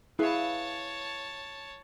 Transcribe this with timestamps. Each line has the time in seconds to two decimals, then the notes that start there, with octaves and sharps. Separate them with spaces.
0.19 E4 G#4 B4 C#5 F5 A5